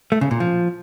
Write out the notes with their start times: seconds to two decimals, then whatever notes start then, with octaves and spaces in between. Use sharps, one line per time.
0.12 A3
0.21 C#3
0.31 A#2
0.40 F3